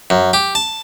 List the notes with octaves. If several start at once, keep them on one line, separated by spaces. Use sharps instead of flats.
F#2
G4
A5